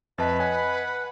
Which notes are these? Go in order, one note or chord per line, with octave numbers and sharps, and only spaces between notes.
F2 B4 D#5 E5 A5
C#5 D#5 F#5 G#5 B5